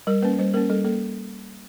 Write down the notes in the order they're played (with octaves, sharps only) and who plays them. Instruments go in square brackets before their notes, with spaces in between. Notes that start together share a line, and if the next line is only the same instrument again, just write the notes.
[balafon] G3 A#4
A#3 C#4 B4
G3 C5
A#3 C#4 A#4
G3 A4
A#3 A4